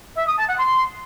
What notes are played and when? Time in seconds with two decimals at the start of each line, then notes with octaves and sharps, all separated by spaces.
0.16 E5
0.27 D#6
0.38 A5
0.48 F#5
0.59 C6